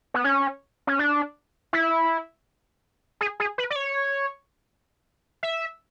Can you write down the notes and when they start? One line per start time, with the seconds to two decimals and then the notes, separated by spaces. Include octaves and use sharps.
0.14 B3
0.24 C#4
0.87 C#4
0.99 D4
1.73 E4
3.21 G#4
3.40 G#4
3.58 B4
3.70 D5
3.76 C#5
5.43 E5